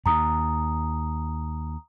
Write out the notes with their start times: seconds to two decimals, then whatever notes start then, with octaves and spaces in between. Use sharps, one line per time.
0.06 D#2 A#5 D#6